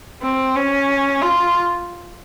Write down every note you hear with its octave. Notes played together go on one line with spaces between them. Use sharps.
C4
C#4
F4